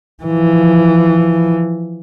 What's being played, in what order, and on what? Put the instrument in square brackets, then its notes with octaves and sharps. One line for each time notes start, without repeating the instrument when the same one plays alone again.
[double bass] E3 F3